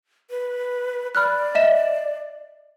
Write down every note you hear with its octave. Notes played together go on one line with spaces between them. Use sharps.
B4
D5 B5 F6 F#6
D#5 E5 E7